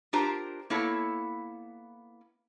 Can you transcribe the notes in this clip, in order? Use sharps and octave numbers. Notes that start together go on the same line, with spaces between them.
D4 F4 G4 A#4 C5 A#5
A#3 B3 E4 A4 C#5